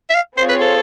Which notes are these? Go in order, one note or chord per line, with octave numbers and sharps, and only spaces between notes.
E5
F5
C4 F4 G#4 C5 C#5
B4
A4